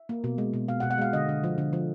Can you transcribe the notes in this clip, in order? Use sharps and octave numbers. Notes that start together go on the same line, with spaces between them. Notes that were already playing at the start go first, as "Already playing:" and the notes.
Already playing: E5
A#3
B2
G#3
B2
B2 F5
F#5
B2
F#5
G#3 F5
D3 D#5
D3
F3
D3
F3